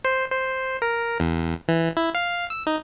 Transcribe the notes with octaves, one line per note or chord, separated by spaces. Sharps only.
C5
C5
A#4
E2
E3
E4
F5
E6
D#4